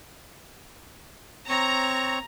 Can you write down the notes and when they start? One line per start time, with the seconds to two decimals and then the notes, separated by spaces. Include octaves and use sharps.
1.49 C4 C#5 A#5 C#6